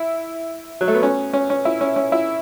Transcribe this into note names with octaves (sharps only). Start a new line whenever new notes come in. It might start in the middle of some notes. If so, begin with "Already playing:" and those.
Already playing: E4
F#3
A3
B3
C#4
C#4
C#4
E4
C#4
C#4
E4